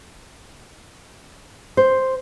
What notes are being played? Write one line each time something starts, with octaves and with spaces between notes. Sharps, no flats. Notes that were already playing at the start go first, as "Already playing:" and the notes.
C5